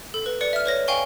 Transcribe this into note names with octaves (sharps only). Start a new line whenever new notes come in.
A4
B4
B4 D5 C#7
E5 F6
B4 C#5 A#6
F5 G5 G#5 C#6 G7